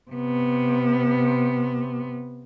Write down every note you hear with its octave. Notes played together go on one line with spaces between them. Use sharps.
C3 B3